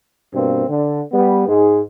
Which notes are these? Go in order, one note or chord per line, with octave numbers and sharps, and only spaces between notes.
G2 B2 A#3 C4
D3
G3 B3
G#2 G#3